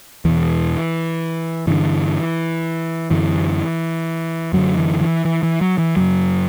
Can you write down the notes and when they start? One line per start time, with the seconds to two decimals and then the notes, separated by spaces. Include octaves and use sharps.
0.25 E2 B2 E3
1.67 G2 D3 E3
3.11 F#2 D3 E3
4.53 F#2 D3 F#3
4.77 E3
5.01 E3
5.25 E3
5.43 E3
5.61 F#3
5.78 E3
5.96 F#2 C#3 F#3